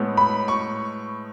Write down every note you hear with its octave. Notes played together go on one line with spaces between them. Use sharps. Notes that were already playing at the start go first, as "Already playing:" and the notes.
Already playing: A2 G#3 B3
B5
C#6